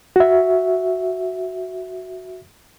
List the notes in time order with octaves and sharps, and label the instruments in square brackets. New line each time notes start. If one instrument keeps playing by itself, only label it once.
[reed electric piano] F#4 E5